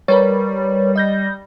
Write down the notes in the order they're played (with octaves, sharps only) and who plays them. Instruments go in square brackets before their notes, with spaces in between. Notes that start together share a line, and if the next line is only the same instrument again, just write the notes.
[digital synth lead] G3 [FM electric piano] A#4 B4 C#5
[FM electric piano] D#5 G6 A#6